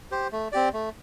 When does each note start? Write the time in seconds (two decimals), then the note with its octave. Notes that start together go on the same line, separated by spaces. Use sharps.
0.11 G4 C5
0.32 A3
0.52 C4 G4 D5
0.73 A3